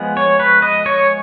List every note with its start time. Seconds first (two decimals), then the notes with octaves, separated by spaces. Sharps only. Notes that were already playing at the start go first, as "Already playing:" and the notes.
Already playing: F3 G#3 B3
0.17 C#5
0.40 B4
0.62 D#5
0.86 C#5